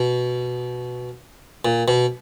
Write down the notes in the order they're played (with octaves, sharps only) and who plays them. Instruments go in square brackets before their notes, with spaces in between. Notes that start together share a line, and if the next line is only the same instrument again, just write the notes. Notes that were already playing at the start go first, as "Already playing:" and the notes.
Already playing: [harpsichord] B2
A#2
B2